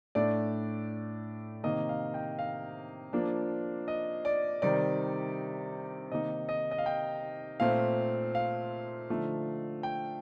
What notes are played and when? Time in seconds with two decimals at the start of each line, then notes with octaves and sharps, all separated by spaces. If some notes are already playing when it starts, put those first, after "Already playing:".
0.15 A2 A3 D4 D5
1.64 C3 D#3 A#3 D#5
1.89 F5
2.14 G5
2.39 F5
3.13 F3 A#3 D4
3.88 D#5
4.25 D5
4.62 C3 D#3 G3 C4 D#4 D5
6.11 C3 D#3 A#3 D#4 D#5
6.49 D#5
6.71 D#5
6.78 F5
6.86 G5
7.60 A#2 A3 C4 F5
8.35 F5
9.10 D3 F3 A3 D#4
9.83 G5